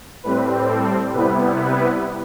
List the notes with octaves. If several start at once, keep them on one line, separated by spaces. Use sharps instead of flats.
A2 G3 C4 B4
A4
C3 G3 B3 E4 B4
B4